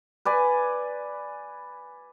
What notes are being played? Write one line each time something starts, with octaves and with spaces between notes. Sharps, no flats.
B4 D5 G#5